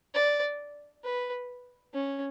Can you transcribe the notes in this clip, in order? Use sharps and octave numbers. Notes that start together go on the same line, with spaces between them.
D5
B4
C#4